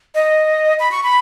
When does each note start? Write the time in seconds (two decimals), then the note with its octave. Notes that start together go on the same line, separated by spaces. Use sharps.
0.15 D#5
0.80 B5
0.92 C#6
1.03 B5